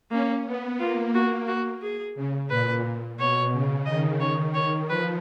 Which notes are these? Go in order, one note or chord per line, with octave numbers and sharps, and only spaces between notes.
A#3 C#4
B3
A#3 F4
A#3 F#4
F#4
G#4
C#3
A#2 B4
B2 C#5
C#3
D#3 D#5
D#3 C#5
C#5
F3 B4